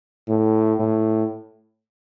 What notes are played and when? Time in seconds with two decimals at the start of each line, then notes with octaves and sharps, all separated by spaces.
0.29 A2
0.80 A2